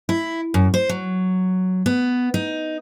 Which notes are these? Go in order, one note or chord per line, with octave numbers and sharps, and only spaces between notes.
E4
F#2
C5
F#3
B3
D#4